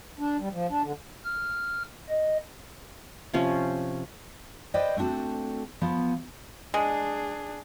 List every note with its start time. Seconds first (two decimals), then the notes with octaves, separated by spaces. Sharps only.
0.19 D4
0.39 G3
0.53 F3
0.70 D4
0.83 D3
1.24 F6
2.09 D#5
3.34 C3 F3 C#4
4.74 B4 C5 D5 D#5 G5
4.97 A3 C4 D4 F#4 A4
5.81 F3 B3
6.74 G#3 D4 G#4